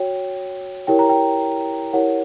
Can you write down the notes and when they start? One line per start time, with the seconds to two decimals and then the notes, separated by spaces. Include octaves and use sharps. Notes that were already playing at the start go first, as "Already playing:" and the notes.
Already playing: F#4 C#5 G5
0.87 E4 G4 A#4 C#5 G5
0.99 A#5
1.09 G5
1.93 E4 G4 A#4 C#5 F#5